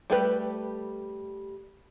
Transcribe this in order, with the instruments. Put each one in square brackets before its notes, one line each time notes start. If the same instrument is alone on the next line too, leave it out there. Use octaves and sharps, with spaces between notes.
[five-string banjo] G3 A3 G4 B4